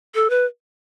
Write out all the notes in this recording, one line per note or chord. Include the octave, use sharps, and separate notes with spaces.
A4
B4